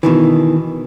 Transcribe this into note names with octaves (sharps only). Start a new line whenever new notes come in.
B2 D#3 E3